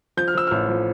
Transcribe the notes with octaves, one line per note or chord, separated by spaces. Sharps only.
F3 G6
F6
F3 E6
A1 F6
F3